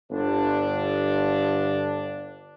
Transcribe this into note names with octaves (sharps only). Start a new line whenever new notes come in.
G1 D4